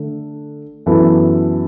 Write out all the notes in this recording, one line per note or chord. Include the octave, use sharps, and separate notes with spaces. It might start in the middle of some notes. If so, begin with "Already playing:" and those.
Already playing: D3 A3 D4 A4
F#2 E3 B3 E4 A4